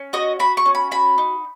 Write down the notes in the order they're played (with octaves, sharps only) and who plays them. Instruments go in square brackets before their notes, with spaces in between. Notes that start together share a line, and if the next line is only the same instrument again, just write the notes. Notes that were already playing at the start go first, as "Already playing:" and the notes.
Already playing: [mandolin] C#4
F#4 D#5
F#4 B5
C#6
C#4
B5
F#4 B5
D#4